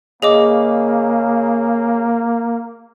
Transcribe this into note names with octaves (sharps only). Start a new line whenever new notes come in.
C#3 A#3 G#4 D#5 D6